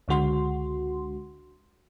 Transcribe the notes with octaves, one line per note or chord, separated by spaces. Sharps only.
C#2 D3 G#3 F#4 C6